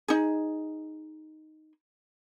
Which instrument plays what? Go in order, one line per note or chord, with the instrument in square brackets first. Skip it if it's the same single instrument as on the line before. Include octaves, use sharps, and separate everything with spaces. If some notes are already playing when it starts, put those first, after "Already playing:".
[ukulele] D#4 G#4